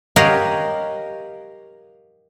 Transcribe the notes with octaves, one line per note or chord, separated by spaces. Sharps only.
G4 A#4 C#5 D#5 F5 F#5